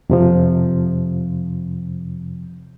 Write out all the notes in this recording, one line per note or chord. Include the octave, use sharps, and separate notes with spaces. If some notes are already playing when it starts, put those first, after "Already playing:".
F2 C3 F3